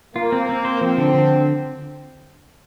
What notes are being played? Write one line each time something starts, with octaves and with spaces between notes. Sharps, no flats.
A#3 F4
C4
C4
C5
F3 C4
D3
D3